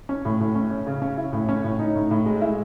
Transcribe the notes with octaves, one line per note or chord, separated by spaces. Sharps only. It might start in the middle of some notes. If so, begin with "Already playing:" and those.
C#4
A2
A2
C#4
C#4
C#3
C#4
E4
A2
C#4
A2
D#4
A2
A2
G#3
E4